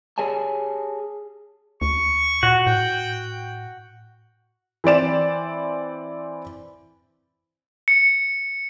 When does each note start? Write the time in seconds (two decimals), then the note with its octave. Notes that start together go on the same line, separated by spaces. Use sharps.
0.18 G4 G#4 C#5 G#5 A5
1.82 D2 C#6
2.43 A#2 F#4
2.67 A2 G5
4.84 E3 C4 D5 E7
7.88 C#7